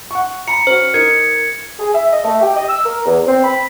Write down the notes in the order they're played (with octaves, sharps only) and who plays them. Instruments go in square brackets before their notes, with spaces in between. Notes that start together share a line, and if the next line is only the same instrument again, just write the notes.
[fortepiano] F#5 C#6
[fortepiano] A#5 B5 [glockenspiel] C#7
[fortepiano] C#4 F#4 [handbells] C5
[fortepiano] D#4 [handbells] A#4 [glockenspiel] G#6 C#7
[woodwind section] G#4
E5
D#5
A3
G4
D#5
E6
A#4
E2
C4
B5